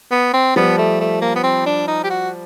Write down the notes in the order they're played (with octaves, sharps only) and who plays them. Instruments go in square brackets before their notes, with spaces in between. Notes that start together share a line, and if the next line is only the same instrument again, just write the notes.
[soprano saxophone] B3
C4
[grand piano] F3 G3 [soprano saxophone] B3
[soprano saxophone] A3
A3
A#3
B3
C4
D4
D#4
G4
F#4